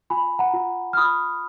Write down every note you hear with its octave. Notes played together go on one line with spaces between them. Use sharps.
F4 G#5 B5
F#5 A#5
F4
F6
F4 B5 D#6